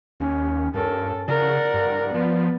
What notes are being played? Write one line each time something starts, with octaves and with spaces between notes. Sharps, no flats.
D#2 C#4
G2 C#4 A4 A#4
C#3 A#4 D5 F#5
G2
F3 B3